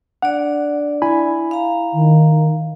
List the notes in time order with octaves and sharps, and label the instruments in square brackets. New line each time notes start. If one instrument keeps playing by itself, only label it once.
[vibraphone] D4 D5 [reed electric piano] F#5
[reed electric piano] E4 G#5 B5
[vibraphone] F5 A#5
[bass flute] D#3